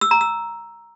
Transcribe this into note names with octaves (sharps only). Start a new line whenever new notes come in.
E6
A#5
E6